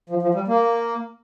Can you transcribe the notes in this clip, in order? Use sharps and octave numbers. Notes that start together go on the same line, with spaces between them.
F3
F3
G3
A#3